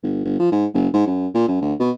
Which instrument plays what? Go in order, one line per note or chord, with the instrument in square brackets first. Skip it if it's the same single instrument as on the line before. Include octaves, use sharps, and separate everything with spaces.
[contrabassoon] G1
G1
F3
G#2
F#1
G#2
F#2
A#2
F#2
D2
B2